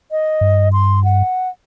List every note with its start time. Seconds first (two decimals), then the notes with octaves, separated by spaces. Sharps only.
0.11 D#5
0.41 G2
0.73 C6
1.04 F#5